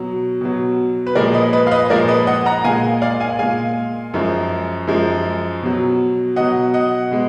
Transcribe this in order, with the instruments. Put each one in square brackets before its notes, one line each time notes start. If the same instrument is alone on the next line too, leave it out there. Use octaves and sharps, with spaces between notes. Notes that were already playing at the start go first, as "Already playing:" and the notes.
Already playing: [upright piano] B2 F#3
B2 F#3
B4
A#2 F3 G#3 A#4 D5
B4 D#5
B4 D#5
F5
B4 D#5
A#2 F3 G#3 A#4 D5
B4 D#5
D#5 F#5
F#5 A#5
A#2 F5 G#5
G#3
D5 F5
F5 G#5
A#2 G#3 F5 G#5
F#2 F3 G#3
F#2 F3 G#3
B2 F#3
B2 F#3 D#5 F#5
D#5 F#5
B2 G#3